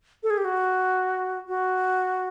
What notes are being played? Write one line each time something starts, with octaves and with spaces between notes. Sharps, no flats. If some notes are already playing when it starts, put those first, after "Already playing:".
A4
G#4
G4
F#4
F#4